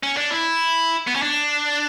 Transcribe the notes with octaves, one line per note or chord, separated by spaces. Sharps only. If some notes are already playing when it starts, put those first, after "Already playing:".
C#4
D4
E4
B3
C#4
D4